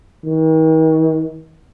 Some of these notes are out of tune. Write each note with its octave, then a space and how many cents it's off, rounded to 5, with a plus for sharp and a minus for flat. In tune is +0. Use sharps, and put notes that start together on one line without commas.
D#3 +40